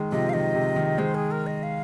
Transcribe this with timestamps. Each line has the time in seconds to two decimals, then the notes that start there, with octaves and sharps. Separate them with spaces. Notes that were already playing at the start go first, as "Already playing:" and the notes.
Already playing: D#3 G#3
0.12 C3 F3 D#5
0.29 F5
0.33 D#3 D#5
0.55 C3
0.76 D#3
0.98 D#3 G#3 C5
1.14 G#4
1.31 A#4
1.47 D#5
1.63 F5